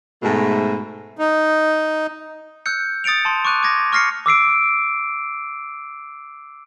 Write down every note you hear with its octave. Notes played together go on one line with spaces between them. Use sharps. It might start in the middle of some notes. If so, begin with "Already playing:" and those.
G#2 B2 A3
D#4
E6 F#6 G6 C#7
D#6 A6 C#7 D7 F7
A5 C6
C#6 D6 F#6 D#7
D6 G#6 A#6
C#6 F6 A#6 C7 C#7
D6 E6 C7 D7